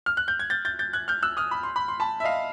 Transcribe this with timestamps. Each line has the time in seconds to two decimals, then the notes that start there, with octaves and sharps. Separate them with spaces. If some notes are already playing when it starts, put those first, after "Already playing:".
0.06 F6
0.17 F#6
0.28 G6
0.39 G#6
0.50 G6 A6
0.65 G6 A6
0.79 G6 A6
0.93 F#6 G#6
1.08 F6 G6
1.22 E6 F#6
1.37 D#6 F6
1.51 B5
1.63 C6
1.76 B5
1.88 C6
2.00 A5 B5
2.20 E5
2.24 D#5 F5